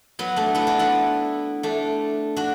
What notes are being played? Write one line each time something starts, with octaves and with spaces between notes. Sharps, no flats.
F#3 B3
A3 D4
B3 E4
D4 F#4
B3 E4
A3 D4
D4 F#4